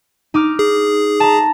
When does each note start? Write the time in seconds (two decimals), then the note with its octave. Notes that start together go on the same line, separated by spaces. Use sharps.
0.34 D#4 D6 F6
0.59 G#4
1.20 A5 A#5